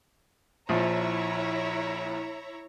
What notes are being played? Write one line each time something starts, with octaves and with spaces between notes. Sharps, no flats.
A#1 F3 E4 C#5 A#5